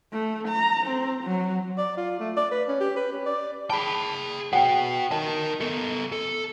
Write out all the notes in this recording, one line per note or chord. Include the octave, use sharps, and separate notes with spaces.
A3
A#5
C4
F#3
D5
F4
A3
D5
B4
C#4
G4
B4
C#4
D5
G#4 G5 A5 B5
F#4 B4 F#5 G5
A#4 D#5 A5
B3 A4
A4